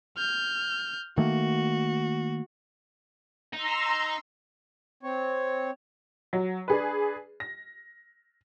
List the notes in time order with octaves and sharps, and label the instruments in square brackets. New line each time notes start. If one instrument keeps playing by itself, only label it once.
[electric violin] F6 G6
[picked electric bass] D#3 A3 A#3 [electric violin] F#4
[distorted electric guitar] D#4 [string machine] A#5 C6 E6
[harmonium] C4 C#5
[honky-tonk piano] F#3
D4 G#4 B4
A#6